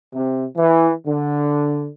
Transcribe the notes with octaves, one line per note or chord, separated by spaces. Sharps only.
C3
E3
D3